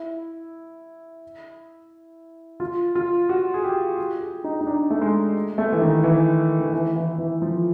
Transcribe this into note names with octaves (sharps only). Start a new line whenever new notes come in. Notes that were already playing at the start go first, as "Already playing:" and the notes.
Already playing: E4
F4
F4
F#4
G#4
G4
G4
G#4
D#4
D#4
D4
A3
G#3
A3
E3
D#3
E3
D#3
E3
E3
E3
F3